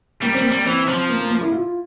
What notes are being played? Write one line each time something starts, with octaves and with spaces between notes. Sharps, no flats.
G3 A#3
G3 C4
A#3
G3
E3 C4
F3 C4
A#3
A#3
A#3
E4
F4